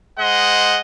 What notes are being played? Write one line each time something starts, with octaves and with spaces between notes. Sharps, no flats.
G#3 C5 D#5 F#5